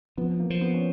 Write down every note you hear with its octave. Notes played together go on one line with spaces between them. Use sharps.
F3 B3
A#3
F3
B3
C#4